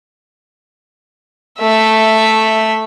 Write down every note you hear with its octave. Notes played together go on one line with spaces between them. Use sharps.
A3 E5